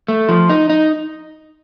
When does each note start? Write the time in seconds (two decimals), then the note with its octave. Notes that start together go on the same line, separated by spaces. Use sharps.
0.08 A3
0.29 F3
0.50 D#4
0.70 D#4